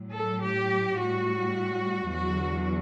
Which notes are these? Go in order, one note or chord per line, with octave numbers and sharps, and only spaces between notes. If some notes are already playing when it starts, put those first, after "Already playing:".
Already playing: A2 F#3
A4
G4
A2 G3 F#4
E2 D3 F#3 F#4